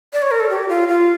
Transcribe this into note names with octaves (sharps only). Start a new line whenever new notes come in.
D5
C#5
A#4
A4
G4
F4
F4